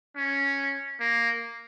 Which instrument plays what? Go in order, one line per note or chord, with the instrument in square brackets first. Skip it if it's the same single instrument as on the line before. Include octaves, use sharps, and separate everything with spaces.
[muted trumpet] C#4
A#3